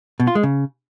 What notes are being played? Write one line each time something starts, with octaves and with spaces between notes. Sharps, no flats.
B2
F4
G#3
C#3